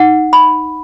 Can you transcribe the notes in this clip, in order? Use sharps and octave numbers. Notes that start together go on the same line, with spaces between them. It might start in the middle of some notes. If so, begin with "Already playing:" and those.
Already playing: D#4 F#5
B5